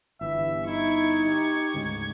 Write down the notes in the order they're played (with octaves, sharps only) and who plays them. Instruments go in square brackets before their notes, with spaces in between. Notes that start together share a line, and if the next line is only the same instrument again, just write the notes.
[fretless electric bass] G1 [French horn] E3 [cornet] E5
[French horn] D#4 [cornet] E4 [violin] C#6 G#6
[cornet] G4
[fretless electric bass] D2 G#2 C#3